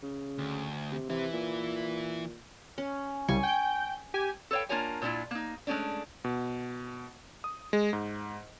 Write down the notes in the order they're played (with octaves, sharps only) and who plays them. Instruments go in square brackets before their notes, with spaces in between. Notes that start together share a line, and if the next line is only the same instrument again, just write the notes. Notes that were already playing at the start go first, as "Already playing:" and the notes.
[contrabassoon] C#3
[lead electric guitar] D2
[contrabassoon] C3
[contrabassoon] C3 [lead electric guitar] E3 E4
[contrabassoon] A#2
[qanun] C#4
[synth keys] C2 C#3 G3 [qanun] G#5 C#6
[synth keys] G5 G6
G4 G#5
[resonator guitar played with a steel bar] A4 B4 C#5 F5 G5
A#3 D4 F4 A#4 C#5 G#5
A#2 F3 D4 E4 F4
A#3 D#4
G#3 A3 C#4 D4
[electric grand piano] B2
D#6
G#3
G#2